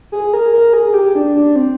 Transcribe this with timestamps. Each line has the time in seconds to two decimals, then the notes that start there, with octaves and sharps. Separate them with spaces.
0.12 G#4
0.34 A#4
0.53 A#4
0.73 G#4
0.94 G4
1.15 D4
1.35 D4
1.56 C4